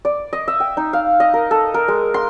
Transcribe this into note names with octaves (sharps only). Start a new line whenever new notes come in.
D5
D#5
E5
G5
D#4
F5
D#5
A#4
A4
A#4
G#3
C6